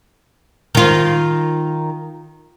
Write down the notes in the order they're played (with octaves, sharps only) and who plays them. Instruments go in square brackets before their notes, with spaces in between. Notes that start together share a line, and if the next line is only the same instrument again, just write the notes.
[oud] D#3 F4